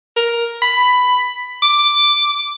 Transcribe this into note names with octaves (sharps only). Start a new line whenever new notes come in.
A#4
B5
D6